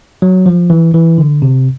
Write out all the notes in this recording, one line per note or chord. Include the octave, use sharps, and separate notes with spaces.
F#3
F3
E3
E3
D3
C3